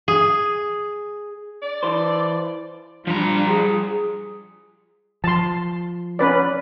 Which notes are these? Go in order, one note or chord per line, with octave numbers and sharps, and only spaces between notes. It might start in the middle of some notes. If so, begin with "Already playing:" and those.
G#4
D5
E3 C5
F3 G3 D4 F4 G4 A#5
G#4
F3 A5 C6
C#4 B4 D5